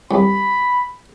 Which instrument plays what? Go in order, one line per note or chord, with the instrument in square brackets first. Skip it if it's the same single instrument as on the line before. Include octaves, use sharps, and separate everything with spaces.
[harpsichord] C2 [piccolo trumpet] B5